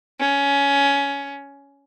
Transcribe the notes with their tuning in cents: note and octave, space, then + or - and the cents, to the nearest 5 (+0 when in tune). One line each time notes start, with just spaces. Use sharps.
C#4 +15